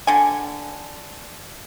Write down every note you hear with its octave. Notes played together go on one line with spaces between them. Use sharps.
D3 G#5